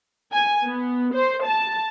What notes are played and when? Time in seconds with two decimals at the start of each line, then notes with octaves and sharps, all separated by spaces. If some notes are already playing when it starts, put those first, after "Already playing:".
0.32 G#5
0.64 B3
1.14 C5
1.44 A5